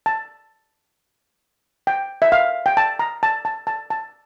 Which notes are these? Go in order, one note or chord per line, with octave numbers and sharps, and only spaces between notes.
A5
G5
E5
F5
G5
A5
A#5
A5
A5
A5
A5